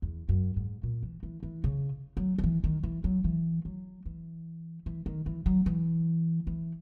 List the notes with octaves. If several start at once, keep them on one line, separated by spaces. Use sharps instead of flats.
E2
F#2
G#2
A#2
E3
E3
E3
C#3
F#3
F#3
E3
D#3
E3
F#3
E3
F#3
E3
E3
D#3
E3
F#3
E3
E3